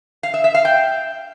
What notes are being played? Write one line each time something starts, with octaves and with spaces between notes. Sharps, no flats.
F5
E5
E5
F5
G5